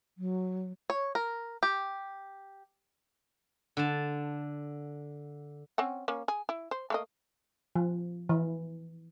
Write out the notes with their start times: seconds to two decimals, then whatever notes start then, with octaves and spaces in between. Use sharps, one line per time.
0.18 F#3
0.90 C#5
1.15 A#4
1.63 G4
3.77 D3 A5
5.78 C4 C#4 F#5
6.08 A#3 C#4
6.28 G#4
6.49 E4
6.71 C5
6.90 A3 A#3 D#5
7.75 F3
8.29 E3